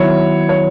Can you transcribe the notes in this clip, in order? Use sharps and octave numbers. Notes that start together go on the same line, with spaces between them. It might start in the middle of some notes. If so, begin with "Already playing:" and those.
Already playing: D#3 F#3 B3 E4 C#5
C#5